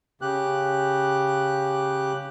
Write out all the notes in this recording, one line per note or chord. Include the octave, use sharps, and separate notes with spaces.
C#3 G4 F#6